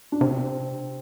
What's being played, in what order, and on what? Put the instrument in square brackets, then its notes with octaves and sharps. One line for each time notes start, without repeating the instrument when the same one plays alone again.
[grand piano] D4
[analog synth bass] C3 [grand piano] C4